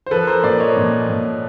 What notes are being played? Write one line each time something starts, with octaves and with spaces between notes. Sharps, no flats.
C5
F3 A4 B4
A#4 C5
A#2 C5 D5
C#5 D#5
A#2
A#2